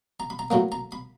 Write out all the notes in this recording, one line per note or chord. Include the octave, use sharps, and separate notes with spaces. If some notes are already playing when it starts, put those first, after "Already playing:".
A#5
B5
A#5
A2 F#3 A#3 A#5
A#5
B5